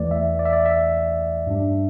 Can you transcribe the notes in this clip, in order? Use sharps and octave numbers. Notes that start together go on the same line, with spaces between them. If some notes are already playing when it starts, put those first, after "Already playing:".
Already playing: E2 E3 A3 D5
E5
D5
E5
D5
E5
G2 G3 D4